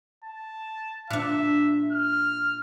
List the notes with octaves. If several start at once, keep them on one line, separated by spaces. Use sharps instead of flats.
A5
A#2 D4 E5
F6